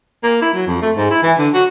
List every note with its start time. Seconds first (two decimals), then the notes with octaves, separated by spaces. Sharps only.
0.24 A#3
0.42 E4
0.54 F#3
0.68 F2
0.82 A3
0.97 G#2
1.11 E4
1.23 E3
1.39 D3
1.54 F#4